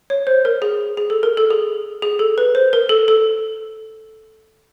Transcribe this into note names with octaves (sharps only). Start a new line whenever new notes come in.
C#5
C5
A#4
G#4
G#4
A4
A#4
A4
G#4
G#4
A4
B4
C5
A#4
A4
A4